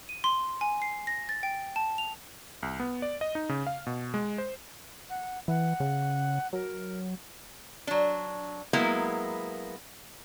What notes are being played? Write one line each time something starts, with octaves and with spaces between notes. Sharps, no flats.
D#7
C6
G#5
C7
A#6
A6
G5
A5
F7
C2
B3
D5
D#5
D#4
C#3
F5
B2
G#3
C5
F#5
E3 F#5
C#3
F#3 A#4
F#3 D4
F#3 G#3 A#3 B3 E4